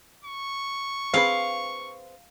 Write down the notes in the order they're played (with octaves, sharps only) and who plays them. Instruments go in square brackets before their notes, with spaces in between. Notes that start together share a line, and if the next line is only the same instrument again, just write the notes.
[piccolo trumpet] C#6
[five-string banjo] C4 G#4 B4 [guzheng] F5